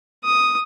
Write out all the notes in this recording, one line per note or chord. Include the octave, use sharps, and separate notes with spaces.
D#6